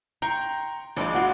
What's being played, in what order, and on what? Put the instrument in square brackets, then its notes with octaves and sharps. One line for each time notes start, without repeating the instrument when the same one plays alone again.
[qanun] G5 C6 C#6 [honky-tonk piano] A#5
[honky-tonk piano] G#1 F3 G#3 [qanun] D4 D6
[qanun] F#4 D5 C6 [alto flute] F#5